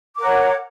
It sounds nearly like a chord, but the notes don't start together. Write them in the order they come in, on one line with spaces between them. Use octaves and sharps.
D6 A#4 F#5 C#5